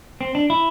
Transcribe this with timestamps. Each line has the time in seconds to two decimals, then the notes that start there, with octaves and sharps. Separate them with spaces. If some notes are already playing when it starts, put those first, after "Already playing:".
0.21 C4
0.35 D4
0.50 E4